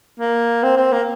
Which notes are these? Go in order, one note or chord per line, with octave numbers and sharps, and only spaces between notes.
A#3
C4
C4
A#3